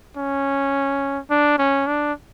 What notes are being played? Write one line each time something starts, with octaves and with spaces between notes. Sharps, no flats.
C#4
D4
C#4
D4